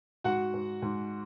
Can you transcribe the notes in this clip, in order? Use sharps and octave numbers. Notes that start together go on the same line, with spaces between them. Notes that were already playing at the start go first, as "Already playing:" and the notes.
G#2 F#4 F#5
G#2
G#2